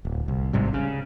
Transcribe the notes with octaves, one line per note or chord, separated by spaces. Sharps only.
D1
C2
G#1 G#2 C3 G3
C#3